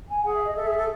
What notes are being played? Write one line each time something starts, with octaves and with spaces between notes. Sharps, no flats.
G#5
G#4 F#5
E5
D#5
A4 E5
G#4
A4